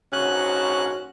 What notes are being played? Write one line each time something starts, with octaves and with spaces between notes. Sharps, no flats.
A#1 G#2 C#4 F#4 F#6